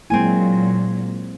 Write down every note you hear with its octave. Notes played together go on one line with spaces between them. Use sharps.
A#2 F#3 G#3 A#3 C4 E4 G#5